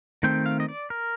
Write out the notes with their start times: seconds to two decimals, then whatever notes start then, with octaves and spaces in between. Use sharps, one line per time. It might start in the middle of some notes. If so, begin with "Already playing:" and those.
0.23 D#3 A3 C4 G5
0.46 F5
0.60 D#5
0.69 D5
0.90 A#4